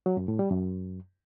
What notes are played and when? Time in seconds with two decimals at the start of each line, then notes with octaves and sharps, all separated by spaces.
0.06 F#3
0.17 F#2
0.28 A2
0.39 G3
0.50 F#2